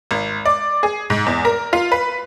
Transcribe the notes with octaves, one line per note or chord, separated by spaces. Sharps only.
G#1
D5
G#4
G#2
E2
A#4
F4
B4